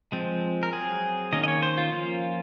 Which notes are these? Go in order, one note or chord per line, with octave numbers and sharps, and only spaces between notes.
F3 G#3 C4
A#4
F#3 C4 G#4
D#3 A#3 C#4 D#5
D#5
C#5
C5
F4
F3 A#3 C#4